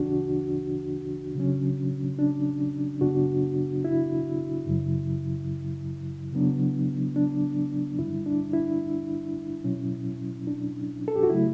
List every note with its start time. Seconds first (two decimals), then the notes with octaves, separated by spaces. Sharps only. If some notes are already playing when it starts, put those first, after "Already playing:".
Already playing: D2 C#3 E3 D4 F#4
1.35 C#3 F#3 C#4
2.19 D4
3.01 F#2 C#3 F#3 B3 D4 F#4
3.85 E4
4.66 F#2 C#3 F#3
6.33 C#3 F#3 B3 D4
7.16 D4
7.98 G2 D3 G3 E4
8.26 D4
8.53 E4
9.64 B2 F#3 C#4
10.47 D4
11.08 A4
11.16 G4
11.23 F#4
11.30 C#3 F#3 A3 E4